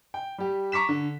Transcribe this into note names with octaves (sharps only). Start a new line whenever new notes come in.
G5
G3 G4
A#5 C#6 D6 B6 E7
D3